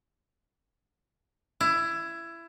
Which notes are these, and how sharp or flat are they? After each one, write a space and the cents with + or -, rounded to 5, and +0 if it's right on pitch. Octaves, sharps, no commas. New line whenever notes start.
E4 +20